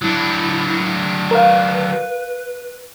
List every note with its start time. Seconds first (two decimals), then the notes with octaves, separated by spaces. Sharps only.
0.02 F#3 D4 E4
1.31 A#4 B4 F5